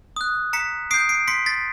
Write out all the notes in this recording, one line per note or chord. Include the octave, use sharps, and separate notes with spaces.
D#6 F#6
A#5 B6 C#7
D#6 G6 C7 D7
C7 D7
C6 B6 C#7
A6 B6